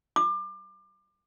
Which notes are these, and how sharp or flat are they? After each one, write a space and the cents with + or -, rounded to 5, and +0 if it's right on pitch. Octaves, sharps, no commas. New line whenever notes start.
D6 +30